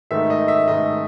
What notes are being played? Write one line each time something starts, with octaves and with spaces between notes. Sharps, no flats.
G#2 D#3 A3 D#4 E5
D#5
E5
G#2 D#3 A3 D#4 D#5